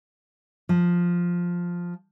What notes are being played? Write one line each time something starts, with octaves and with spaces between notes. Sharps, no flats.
F3